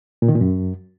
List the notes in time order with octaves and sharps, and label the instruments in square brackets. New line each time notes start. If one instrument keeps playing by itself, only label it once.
[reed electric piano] A#2
D#3
A#2
F#2